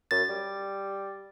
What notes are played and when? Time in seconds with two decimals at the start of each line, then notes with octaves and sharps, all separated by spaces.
0.11 F#2 A6
0.29 G3